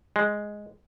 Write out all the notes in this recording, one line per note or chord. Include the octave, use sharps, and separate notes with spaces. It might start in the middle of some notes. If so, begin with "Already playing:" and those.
G#3